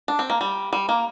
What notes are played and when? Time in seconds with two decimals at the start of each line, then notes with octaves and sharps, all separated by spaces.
0.08 D4
0.19 C4
0.30 A#3
0.41 G3
0.73 G3
0.89 A#3